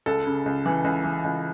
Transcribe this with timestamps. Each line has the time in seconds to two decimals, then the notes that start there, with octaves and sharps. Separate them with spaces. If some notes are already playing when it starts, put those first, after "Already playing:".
0.06 C#2 A4
0.27 C#3
0.46 C#2
0.66 E3
0.84 C#2
1.04 E3
1.24 C#2